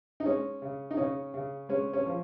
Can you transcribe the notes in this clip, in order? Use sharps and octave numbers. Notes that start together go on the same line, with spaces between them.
D#4
G#3 C#4
C#3
D#4
C#3 C#4
C#3
G#3 C#4
C#4
F3